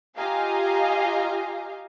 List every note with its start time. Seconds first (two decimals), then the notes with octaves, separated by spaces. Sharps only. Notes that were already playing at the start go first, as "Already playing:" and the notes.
0.17 F4 G4 D#5 F5 G#5 A#5